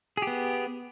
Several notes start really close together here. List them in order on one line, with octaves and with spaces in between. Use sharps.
G#4 G4 B3